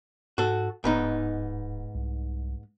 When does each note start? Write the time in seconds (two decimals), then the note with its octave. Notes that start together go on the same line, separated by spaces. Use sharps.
0.38 G#2 F#4 A4
0.84 D1 G#2 B3 D#4
1.95 C2